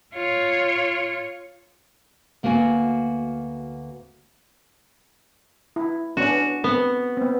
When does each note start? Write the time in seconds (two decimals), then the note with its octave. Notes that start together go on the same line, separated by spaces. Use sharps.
0.14 F4 C#5
2.43 D2 A#3 B3 F#4 F#5 G#5
5.76 E4
6.17 B3 C#4 D4 F#4
6.64 B3 C4
7.17 B3 C4